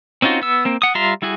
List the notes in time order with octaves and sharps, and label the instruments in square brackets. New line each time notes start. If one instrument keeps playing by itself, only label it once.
[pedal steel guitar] C4 C#4 D#4 F4 F#4
B3 E6
A#3 C4
F#5 D#6
G3 F4 E5 A#5 C6
G3 E4 F#4 G#4